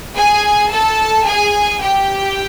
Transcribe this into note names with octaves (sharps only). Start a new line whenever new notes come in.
G#4 G#5
A4 A5
G#4 G#5
G4 G5